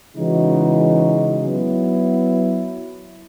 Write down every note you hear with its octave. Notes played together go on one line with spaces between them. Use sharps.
C#3 E3 G#3 D#4 F#4
F#3 B3 E4